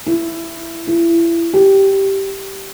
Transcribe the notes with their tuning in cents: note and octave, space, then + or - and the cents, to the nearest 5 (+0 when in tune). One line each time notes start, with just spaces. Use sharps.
E4 +15
E4 +30
G4 -10